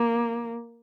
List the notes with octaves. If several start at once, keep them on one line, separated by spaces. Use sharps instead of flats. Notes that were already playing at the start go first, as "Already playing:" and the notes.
Already playing: A#3